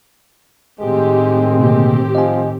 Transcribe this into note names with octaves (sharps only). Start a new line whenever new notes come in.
A2 D#3 G#3 C4 G4
B2 D3 A#3 G4
F3 D#5 G#5